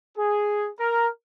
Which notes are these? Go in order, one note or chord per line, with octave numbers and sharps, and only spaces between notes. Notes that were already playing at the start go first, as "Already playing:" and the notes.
G#4
A#4